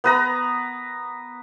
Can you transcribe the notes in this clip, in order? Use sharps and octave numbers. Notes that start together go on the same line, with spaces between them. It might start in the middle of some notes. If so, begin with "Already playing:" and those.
B3 B4 A#5